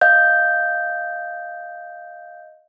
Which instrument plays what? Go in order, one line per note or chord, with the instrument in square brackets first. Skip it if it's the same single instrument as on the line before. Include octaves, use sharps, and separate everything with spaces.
[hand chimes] D#5 F5 G6